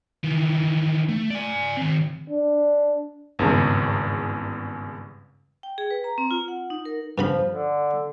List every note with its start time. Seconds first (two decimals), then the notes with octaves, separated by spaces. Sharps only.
0.24 D#3 E3
1.09 A3
1.31 D5 G#5
1.77 D#3 C4
2.30 D4
3.39 G#1 E2 G2 C#3
5.63 G5
5.78 G#4
5.91 B4
6.04 A#5
6.18 C4
6.31 F4
6.48 F#5
6.70 D#4
6.85 A#4
7.18 G2 C#3 F3 B5
7.48 D3